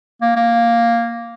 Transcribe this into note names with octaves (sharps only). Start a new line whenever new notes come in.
A#3
A#3